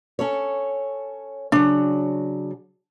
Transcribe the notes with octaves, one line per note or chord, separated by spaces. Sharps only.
C#4 A4 C#5
C#3 F#3 D4